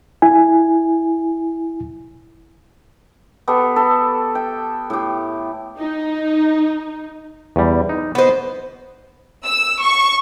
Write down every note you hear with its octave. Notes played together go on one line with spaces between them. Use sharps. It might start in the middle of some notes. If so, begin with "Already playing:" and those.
E4 G#5
B3 G4 A4
A4
G5
A2 G4
D#4
E2 G3
D#4
B3 B4 C5 D#5
E6
C#6